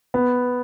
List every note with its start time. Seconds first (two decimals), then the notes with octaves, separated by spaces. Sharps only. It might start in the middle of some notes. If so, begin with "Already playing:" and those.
0.14 B3